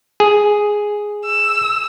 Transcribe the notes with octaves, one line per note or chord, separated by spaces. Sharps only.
G#4
E6